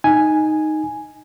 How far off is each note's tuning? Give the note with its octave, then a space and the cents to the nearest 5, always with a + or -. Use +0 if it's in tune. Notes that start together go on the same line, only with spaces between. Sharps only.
D#4 +0 G#5 +0